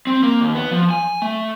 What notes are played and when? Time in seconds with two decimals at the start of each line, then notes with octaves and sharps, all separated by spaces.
0.07 C4
0.23 A#3
0.41 D#2
0.55 B3
0.71 F3
0.91 G#5
1.22 A3